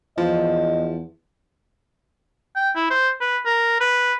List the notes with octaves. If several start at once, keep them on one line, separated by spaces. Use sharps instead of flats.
E2 F3 D#5
G5
E4
C5
B4
A#4
B4